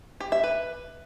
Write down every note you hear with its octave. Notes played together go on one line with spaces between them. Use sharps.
G4
E5
B4